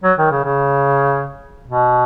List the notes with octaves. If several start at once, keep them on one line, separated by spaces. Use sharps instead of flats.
F#3
D#3
C#3
C#3
B2